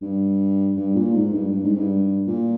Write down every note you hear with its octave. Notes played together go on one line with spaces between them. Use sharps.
G2
G2
A#2
G#2
G2
G2
G#2
G2
A#2